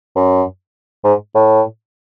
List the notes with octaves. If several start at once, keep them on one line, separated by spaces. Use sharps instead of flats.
F#2
G#2
A2